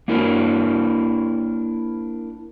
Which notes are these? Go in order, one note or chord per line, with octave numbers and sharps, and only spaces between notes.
A#3 D4 E4 A#4 C5